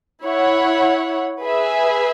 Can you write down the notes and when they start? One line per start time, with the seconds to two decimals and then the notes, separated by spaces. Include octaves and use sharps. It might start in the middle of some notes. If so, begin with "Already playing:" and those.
0.24 E4 C#5 F#5
1.43 G#4 B4 E5 G#5